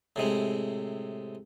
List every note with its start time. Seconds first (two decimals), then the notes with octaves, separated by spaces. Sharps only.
0.16 A2 C3 G#3